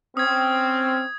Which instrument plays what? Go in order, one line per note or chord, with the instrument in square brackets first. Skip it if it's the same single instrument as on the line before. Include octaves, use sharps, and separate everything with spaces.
[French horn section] C4 [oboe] C#4 [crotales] D#6 G#6